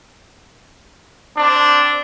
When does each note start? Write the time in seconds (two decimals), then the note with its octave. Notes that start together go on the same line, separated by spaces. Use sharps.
1.36 C4 D4